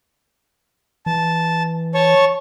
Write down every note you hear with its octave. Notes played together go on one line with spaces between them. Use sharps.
E3 A5
C#5 A5 C#6